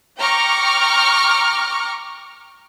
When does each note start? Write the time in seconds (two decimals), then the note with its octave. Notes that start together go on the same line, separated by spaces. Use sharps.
0.19 G5 A#5 C#6 D6 F6